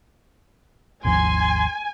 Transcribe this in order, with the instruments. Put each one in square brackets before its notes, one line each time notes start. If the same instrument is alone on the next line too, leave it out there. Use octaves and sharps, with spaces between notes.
[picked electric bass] G#1 D#2 F3 [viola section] G#5 [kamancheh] C6